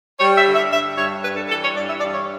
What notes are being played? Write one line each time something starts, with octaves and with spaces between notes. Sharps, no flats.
G3 C#5
E5
D3
E5
G2 E5
G2 C#5
G3 B4
A4
E3 A4
C#5
G2 D5
E5
G2 D5
C#5